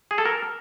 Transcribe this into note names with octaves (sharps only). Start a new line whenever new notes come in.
G#4
A4
A#4